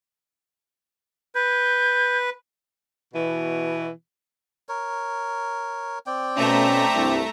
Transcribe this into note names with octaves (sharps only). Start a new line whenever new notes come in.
B4 G6
B2 E3
A#4 C#5
C4 D5 G5
B2 A3 C#4 E5 A#5
C2 G2